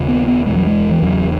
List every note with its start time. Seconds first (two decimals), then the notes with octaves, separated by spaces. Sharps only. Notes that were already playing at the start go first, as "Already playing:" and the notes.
Already playing: D#2 C#3
0.08 B3
0.27 B3
0.46 E2 B2 G#3
0.56 F#3
0.67 G#3
0.91 E3
1.02 E2 C#3 F#3